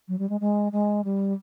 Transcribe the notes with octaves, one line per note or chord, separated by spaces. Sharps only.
F#3
G3
G#3
G#3
G#3
G3